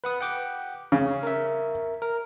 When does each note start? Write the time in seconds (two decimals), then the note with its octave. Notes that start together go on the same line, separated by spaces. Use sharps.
0.04 B4 F#5 D#6
0.21 F#5 G5 D6
0.92 C#3 C#4
1.23 A#4 E5
2.02 A#4